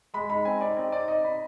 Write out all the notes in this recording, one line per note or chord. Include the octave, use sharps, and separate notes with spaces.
G#3 B5
D#4 B5
C4 G#5
D#4 D5
C4 D#5
D#4 D5
D#4 D#5
D#4 B5